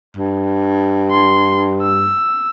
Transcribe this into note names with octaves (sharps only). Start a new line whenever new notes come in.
G2
C6
E6